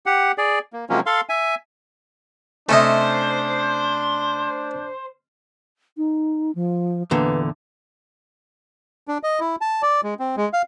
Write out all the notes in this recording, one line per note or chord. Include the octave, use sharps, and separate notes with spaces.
G4 F#5
G#4 D5
A#3
C3 F3 F#3 G#3 A#3 C#4
A4 F5 C6
E5 G#5
C3 A3 C#4 D4 C5 D#5 E5 A5
D#4
F3
E2 A#2 D3 B4
D4
D#5
E4
A5
D5
G#3
C4
G#3
F5